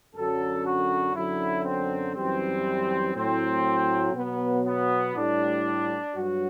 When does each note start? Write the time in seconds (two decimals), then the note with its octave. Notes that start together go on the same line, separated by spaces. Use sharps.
0.14 F#2 D3 F#3 A4
0.65 F#4
1.14 F#2 D3 F#3 E4
1.64 C4
2.15 F#2 E3 G3 C4
3.14 A2 F#3 C4
4.14 B2 F#3 B3
4.65 B3
5.14 A2 G3 D4
6.14 G2 F#3 F#4